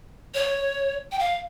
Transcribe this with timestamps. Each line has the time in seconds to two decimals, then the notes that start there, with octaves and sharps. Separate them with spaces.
0.34 C#5
1.12 G5
1.19 F5